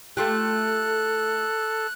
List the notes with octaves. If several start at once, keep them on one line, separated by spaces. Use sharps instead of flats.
A3 F4 G4 A4 F#6